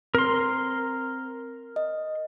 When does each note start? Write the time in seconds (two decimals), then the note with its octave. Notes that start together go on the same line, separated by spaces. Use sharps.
0.15 C4 A#4 C6
1.76 D#5